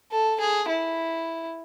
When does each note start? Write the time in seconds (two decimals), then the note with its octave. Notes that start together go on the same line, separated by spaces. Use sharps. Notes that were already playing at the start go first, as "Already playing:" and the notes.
0.12 A4
0.40 G#4
0.69 E4